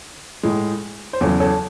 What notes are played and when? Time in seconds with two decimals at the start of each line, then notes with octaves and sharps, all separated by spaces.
0.43 A2 G#3
1.13 C5
1.21 E2 C#3 F#3 A4 C#5
1.40 A4 C#5